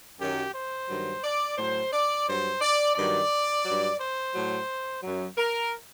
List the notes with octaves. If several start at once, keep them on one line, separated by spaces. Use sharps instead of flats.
F#2 D#3 F#3 G4
C5
G2 D#3 F#3
D5
A2 F#3 C5
D5
G2 F#3 C5
D5
G2 D#3 F#3 D5
G2 F#3
C5
A2 F#3
F#2 F#3
A#4